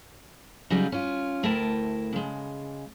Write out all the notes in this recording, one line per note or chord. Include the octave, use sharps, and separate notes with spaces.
C#3 F#3 G3 D#4 F4
C#4 F4
D2 A3 E4 A#4 G5 A5
C#3 G#3